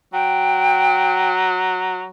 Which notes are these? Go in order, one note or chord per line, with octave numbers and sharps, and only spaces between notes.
F#3 G5